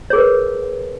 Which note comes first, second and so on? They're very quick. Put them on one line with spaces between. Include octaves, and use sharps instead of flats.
C#5 G#4 A#4 B4